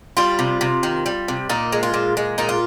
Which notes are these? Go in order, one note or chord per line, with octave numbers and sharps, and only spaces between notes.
G3 F4
C3
C3
D#3
G3
C3
A#2 D#4
G#3
F4
A#2
G#3
A#2 D#4
F4